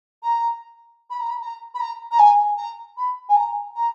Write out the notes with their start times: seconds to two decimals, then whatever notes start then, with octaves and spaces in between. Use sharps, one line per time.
0.22 A#5
1.10 B5
1.19 A#5
1.29 B5
1.40 A#5
1.74 B5
1.80 A#5
2.11 A#5
2.18 G#5
2.57 A#5
2.97 B5
3.29 G#5
3.36 A#5
3.75 A#5